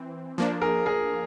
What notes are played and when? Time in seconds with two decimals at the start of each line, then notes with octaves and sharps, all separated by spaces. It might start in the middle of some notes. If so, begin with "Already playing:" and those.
Already playing: E3 C4
0.38 F3 A#3 D4
0.62 G#4 A#4
0.86 G#4 A#4